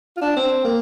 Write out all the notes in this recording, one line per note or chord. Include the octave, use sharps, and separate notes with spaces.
F4
D4
C4
A#3